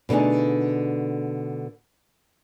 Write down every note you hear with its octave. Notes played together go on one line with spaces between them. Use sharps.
B2 D3 A3 D#4 G#4